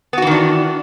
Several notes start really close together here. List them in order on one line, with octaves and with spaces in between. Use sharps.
B3 F#4 E3 D#3 D4